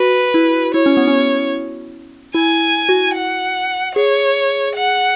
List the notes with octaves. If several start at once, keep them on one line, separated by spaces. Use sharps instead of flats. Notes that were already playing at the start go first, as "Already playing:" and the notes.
Already playing: F#4 B4
E4
E4 C#5
C#4
B3
C#4
E4 G#5
F#4
F#5
G#4 C#5
F#5